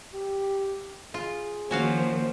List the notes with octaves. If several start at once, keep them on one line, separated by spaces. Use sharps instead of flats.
G4
F4 G#4
D#3 F3 A#3 C#4 F#4 C5 F5